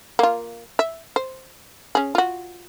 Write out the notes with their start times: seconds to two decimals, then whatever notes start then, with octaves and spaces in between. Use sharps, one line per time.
0.19 A#3 F4
0.79 E5
1.16 C5
1.95 C#4 G#4
2.15 F4 F#4